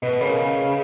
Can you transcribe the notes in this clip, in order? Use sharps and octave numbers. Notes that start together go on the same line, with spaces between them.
B2 B4 D#5
C#3 A#4 C#5